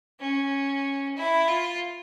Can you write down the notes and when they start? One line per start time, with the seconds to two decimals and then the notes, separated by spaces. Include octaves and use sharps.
0.20 C#4
1.17 E4
1.48 F4